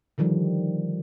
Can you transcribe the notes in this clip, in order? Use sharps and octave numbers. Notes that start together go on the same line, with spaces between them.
D3 D#3 F3 G3